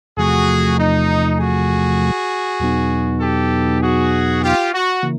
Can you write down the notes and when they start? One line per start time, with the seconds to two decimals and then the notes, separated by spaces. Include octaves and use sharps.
0.17 E2 C3 F3 A3 F#4 G#4
0.78 D#4
1.39 F#4 G#4
2.60 E2 B2 F#3 B3 D#4
3.20 G4 A4
3.81 F#4 G#4
4.42 F4 G4
4.73 F#4
5.03 C#3 E3 A#3